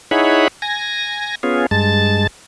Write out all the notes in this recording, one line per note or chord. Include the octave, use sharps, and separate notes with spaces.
D#4 E4 G#4 C#5 F#5 B5
G#5 A#6
B3 C#4 F4 G#4
G2 G#3 A5 A6